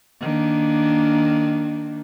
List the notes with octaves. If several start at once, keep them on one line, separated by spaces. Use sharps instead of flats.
D#3 A#3 D4